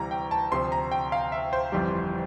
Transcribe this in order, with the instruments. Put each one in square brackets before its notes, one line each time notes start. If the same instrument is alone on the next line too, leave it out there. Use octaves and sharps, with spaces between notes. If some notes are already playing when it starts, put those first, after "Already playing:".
Already playing: [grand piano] D2 C3 E3 G3 A#5
G5
A5
D2 C3 F3 C6
A#5
G5
F5
E5
C5
G1 F2 E3 G3